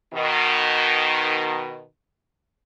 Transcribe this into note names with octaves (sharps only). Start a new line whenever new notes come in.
B2 D#3